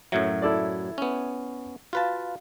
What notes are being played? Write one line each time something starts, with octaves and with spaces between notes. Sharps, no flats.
F#2 A2 F#3 E5 G#6
E4 A4 D5
B3 C#4
F4 F#4 B4 F5 A5